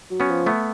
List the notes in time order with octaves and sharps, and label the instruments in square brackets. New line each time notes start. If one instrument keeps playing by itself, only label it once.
[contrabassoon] F#3
[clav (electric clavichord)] B3 C#4
[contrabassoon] F3
[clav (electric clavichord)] A3 B3